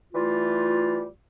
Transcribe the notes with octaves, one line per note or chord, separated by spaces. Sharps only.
E3 G3 A3 F4